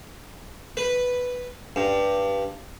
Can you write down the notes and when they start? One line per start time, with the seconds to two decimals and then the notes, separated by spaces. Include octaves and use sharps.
0.77 B4
1.76 G2